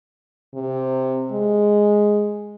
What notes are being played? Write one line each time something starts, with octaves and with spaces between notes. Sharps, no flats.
C3
G#3